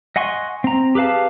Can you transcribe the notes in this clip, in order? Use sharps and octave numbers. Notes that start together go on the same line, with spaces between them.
D#5 F#5 G#5 C6 C#6
C4 A#5
G4 G#4 B4 F5 A5